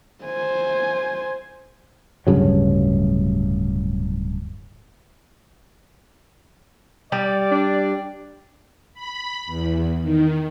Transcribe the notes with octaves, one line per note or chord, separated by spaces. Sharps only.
C5 G#5
D1 G2 C#3 F#3
G3 D5
D4
B5
E2
D#3